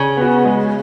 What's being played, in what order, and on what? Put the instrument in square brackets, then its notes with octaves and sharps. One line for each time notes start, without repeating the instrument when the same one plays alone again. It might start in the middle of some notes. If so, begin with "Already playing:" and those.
Already playing: [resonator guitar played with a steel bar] C#3
[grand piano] B3 F#4
G#3